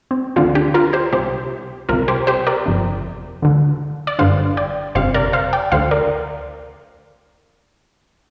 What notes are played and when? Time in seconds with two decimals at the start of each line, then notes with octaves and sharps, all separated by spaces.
0.11 C4
0.36 D2 D3 C4 F4
0.55 D4 G4
0.74 F4 A#4
0.93 G4 C5
1.13 C2 C3 G4 C5
1.89 C2 C3 F4 A#4
2.08 G4 C5
2.27 G4 C5
2.47 A#4 D5
2.66 G1 F2 C3
3.42 D2 D3
4.07 D5
4.19 G1 G2 D3 C5 F5
4.57 D5 G5
4.95 G1 F2 C3 C5 F5
5.14 A#4 D5
5.33 C5 F5
5.53 D5 G5
5.72 D2 D3 C5 F5
5.91 A#4 D5